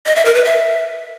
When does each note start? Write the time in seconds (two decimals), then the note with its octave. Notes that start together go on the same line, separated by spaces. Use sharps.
0.06 D#5
0.16 E5
0.25 A#4
0.35 B4
0.44 E5